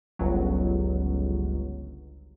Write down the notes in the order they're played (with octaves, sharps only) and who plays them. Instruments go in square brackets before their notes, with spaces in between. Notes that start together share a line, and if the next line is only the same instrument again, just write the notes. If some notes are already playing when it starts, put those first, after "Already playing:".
[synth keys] G1 C#2 F#3